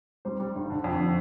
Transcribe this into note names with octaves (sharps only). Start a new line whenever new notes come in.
G3 C5
G3
G1
D3
F2
D3